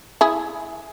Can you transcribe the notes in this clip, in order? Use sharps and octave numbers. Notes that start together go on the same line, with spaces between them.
E4 G#4